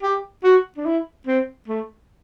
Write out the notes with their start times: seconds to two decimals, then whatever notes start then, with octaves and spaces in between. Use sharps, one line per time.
0.03 G4
0.44 F#4
0.77 D4
0.86 E4
1.27 C4
1.68 A3